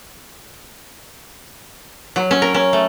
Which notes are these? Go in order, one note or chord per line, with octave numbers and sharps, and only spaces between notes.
F#3
C#4
A#4
C#4
A3